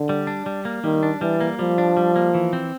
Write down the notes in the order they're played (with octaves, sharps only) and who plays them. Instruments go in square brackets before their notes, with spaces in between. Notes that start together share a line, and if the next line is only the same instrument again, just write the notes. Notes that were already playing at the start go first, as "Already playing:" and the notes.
Already playing: [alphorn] D3
[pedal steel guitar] G3
D4
G3
A#3
[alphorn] D#3 [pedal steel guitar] G3
[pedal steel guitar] D4
[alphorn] E3 [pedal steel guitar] G3
[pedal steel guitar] A#3
[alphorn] F3 [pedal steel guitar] G3
[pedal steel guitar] D4
G3
A#3
E3
C4